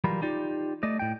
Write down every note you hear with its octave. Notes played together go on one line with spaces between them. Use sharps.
E3 F#3 G3 F4 A#4 B5
D#4 F4 G4 D5
A3 D5 D#5
A2 G5